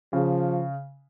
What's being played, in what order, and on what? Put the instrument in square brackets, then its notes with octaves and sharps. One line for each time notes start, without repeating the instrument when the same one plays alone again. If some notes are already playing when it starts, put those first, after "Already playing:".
[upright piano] C#3 [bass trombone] F3